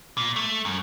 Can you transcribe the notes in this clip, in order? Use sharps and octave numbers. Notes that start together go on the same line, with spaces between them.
A#2
A3
F#2